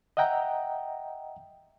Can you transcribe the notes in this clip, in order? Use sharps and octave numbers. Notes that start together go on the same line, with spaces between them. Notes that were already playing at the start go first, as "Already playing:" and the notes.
D#5 E5 F#5 G5 A#5